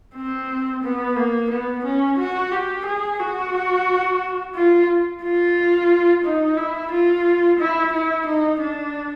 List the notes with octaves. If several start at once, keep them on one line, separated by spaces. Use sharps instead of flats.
C4
B3
A#3
B3
C#4
F#4
G4
G#4
F#4
F4
F4
D#4
E4
F4
E4
E4
D#4
D4